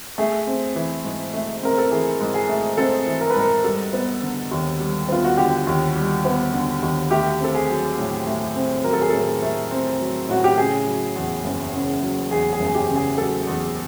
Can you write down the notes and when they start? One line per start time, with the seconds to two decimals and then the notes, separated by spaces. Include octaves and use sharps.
0.18 A3 G#4
0.47 C4
0.76 E3
1.05 G#2
1.34 A3
1.62 C4 A#4
1.78 A4
1.91 E3 G#4
2.20 G#2
2.34 G#4
2.49 A3
2.78 C4 A4
3.07 E3
3.21 A#4
3.30 B4
3.36 G#2 A#4
3.64 G3 A4
3.93 B3
4.22 D3
4.51 D#2
4.80 G3
5.09 B3 F4
5.25 F#4
5.37 D3 G4
5.67 D#2
5.95 G3
6.25 B3
6.53 D3
6.82 D#2
7.11 A3 G4
7.40 C4 A4
7.55 G#4
7.69 F#3
7.98 A2
8.27 A3
8.56 C4
8.84 F#3 A#4
8.93 A4
9.01 G#4
9.10 A2 A4
9.42 A3
9.71 C4
10.00 F#3
10.29 A2 F#4
10.44 G4
10.58 C#3 G#4
10.87 F#3
11.16 E2
11.44 F#1
11.73 C#3
12.02 F#3
12.31 E2 G#4
12.53 G#4
12.60 F#1
12.67 G#4
12.75 G4
12.89 C#3
12.96 G#4
13.18 F#3 A4
13.47 E2